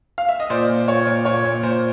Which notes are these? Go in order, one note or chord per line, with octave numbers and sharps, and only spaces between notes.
F5
E5
D#5
A#2 C5 D5
A#2
A#2 C#5
A#2
A#2 C#5
A#2
A#2 C5